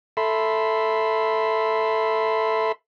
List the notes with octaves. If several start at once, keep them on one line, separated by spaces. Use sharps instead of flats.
A4 E5 B5 C6